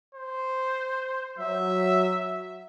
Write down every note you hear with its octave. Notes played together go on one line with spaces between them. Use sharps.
C5
F#3 E5